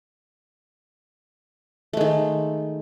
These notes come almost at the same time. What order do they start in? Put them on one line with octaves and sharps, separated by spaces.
A3 G#3 D#3